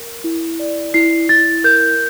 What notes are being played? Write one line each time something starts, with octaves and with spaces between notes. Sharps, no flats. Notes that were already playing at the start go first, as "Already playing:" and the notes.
Already playing: A#4
E4
D5
E4 C7
E4 A6
A#4 G6